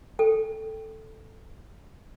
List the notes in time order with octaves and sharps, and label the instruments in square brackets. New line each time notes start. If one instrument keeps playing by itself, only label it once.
[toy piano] A4 G5